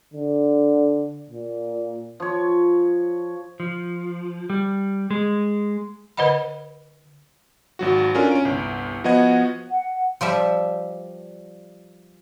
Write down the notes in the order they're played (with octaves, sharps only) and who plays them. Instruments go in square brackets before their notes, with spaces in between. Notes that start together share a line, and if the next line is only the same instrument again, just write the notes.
[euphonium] D3
A#2
[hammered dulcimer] F3 C#5
[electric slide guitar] F3
G3
G#3
[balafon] D3 B4 C5 D#5 F#5 B5
[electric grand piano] G#1 F#3 F#4
C#4 D4 F4 A4 A#4 G#5
C#4 D7
G1 C2
F3 B3 F#4 D#5 F#5 G#6
[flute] F#5
[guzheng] F3 G3 E5